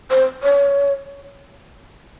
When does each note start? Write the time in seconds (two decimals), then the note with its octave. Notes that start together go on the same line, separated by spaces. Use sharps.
0.10 C5
0.43 C#5